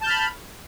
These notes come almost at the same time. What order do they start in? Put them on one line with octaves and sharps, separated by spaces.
A5 G6 F6 B5